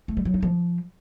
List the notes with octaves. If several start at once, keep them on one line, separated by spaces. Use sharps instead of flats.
A3
G3
F#3
D#4
F3